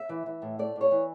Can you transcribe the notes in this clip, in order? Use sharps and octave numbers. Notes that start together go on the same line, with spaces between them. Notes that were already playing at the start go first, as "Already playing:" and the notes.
Already playing: E5
E3
E3
A2
A3 D5
A2
C#5
E3